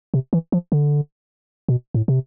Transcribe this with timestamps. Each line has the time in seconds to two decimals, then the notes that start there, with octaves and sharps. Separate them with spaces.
0.14 C3
0.33 E3
0.52 F3
0.72 D3
1.69 B2
1.94 A2
2.08 C3